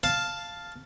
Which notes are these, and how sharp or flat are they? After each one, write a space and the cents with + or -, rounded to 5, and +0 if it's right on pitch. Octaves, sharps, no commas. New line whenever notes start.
F5 +0 A5 +0